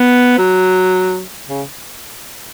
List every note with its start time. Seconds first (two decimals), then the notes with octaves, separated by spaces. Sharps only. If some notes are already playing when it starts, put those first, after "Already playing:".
Already playing: B3
0.38 F#3
1.48 C#3